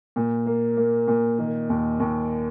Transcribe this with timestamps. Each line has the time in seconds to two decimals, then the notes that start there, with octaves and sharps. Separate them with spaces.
0.16 A#2
0.46 A#3
0.77 A#3
1.08 A#2
1.38 D#3
1.70 D#2
2.00 D#2